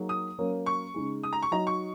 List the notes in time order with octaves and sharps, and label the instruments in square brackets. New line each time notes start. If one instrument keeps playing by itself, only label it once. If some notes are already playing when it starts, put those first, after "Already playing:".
Already playing: [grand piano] F#3 A#3 D#4 G#4
[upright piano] D#6
[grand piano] F#3 A#3 C#4 A#4 C#5
[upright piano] C#6
[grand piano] C#3 G#3 D#4 G#4
[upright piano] D#6
A#5
C#6
[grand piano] F#3 D#4 F#4 D#5 [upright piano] A#5
[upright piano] C#6